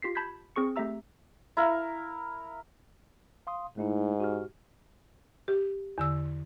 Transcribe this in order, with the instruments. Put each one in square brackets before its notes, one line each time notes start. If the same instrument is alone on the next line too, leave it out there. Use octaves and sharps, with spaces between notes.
[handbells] F4 G4 B6 C7
A5 B5 G6 G#6 B6
C4 G#4 C#6 C#7
A3 C4 G4 E5 A#5 E6
[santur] E4 A#4 F5
[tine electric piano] F5 C6 D#6
[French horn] G#2 [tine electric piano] A3 D#4 E4
[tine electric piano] F#4 G4 F6
[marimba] G4
E2 D3 E6